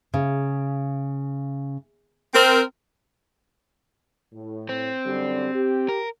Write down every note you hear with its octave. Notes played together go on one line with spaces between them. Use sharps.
C#3
C4 A#4
A2
C4
F#2 D3 G3
G4
A#4